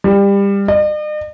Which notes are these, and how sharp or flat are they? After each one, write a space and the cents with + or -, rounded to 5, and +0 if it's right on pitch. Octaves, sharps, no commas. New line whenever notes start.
G3 +25
D#5 -45